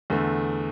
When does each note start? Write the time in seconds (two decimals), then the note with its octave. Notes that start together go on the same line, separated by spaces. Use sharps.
0.10 E2 D3 A3